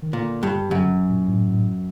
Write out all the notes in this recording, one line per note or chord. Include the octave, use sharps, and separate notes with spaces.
D#3
A#2 D3
G2
F#2 D3
A#2
A2
A2